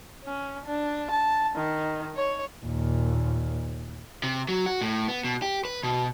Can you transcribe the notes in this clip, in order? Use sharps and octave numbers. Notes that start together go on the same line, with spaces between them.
C#4
D4
A5
D#3
C#5
D#2 A#2
C3
F#3
F#4
A2
B3
B2
G4
B4
B2